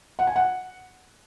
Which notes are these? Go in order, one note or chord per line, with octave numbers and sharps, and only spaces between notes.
F#5
G#5
F#5